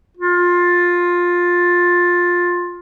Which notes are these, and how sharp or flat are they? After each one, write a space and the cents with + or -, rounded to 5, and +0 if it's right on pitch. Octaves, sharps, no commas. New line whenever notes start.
F4 +15